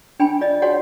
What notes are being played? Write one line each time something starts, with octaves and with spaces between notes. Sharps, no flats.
D4 G5 G#5 B5
F4 D5 D#5
F#4 C#5 D5 F#5 G#5